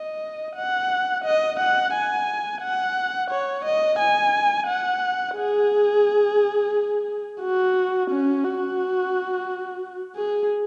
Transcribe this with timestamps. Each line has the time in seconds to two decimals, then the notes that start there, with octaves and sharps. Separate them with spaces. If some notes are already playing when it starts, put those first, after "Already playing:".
Already playing: D#5
0.56 F#5
1.24 D#5
1.60 F#5
1.94 G#5
2.62 F#5
3.30 C#5
3.65 D#5
3.99 G#5
4.67 F#5
5.36 G#4
7.42 F#4
8.10 C#4
8.44 F#4
10.16 G#4